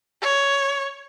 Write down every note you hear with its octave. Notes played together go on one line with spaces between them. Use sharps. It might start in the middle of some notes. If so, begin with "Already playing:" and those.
C#5